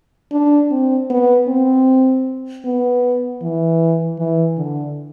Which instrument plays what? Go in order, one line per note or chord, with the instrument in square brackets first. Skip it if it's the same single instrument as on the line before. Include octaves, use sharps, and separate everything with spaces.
[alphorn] D4
C4
B3
C4
B3
E3
E3
D3